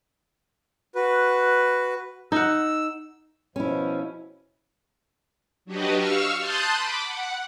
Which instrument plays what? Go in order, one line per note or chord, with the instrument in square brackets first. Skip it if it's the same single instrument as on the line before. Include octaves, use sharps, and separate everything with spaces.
[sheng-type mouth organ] F#4 B4
[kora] D#4 F#5 [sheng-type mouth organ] E6
[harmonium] B2 F3 [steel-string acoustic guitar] C#4 E4
[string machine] F#3 D4 F#4 G4 B4 D#5
F5 C#6 E6 F6
A5 C6 D#6 F#6 G6 A6
B5 D6
F#5